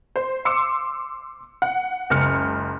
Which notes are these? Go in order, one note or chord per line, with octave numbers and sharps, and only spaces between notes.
C5
C6 D6 E6 C#7
F#5
F#1 C#2 F6 C#7